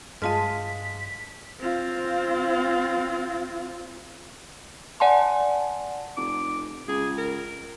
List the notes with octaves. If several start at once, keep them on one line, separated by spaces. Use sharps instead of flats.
G2 G#3 F4 D#5 A5 F6 B6
C4 F4
D5 F#5 G#5 A5 C6
F1 D6
C#2 G#4
A#4